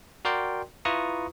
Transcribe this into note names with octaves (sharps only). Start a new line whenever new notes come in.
F#4 A#4 D5 G5 C6
E4 F4 B4 A#5 C#6 D#6